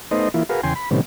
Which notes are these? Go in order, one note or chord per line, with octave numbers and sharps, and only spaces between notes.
A3 B3 D#4 C5 D#5
E3 A#3 E4 F4
F#4 G#4 A#4 B4 F5
E2 C#3 G5 G#5 C6
B5
A2 C3 D#3 G3 B3 C#4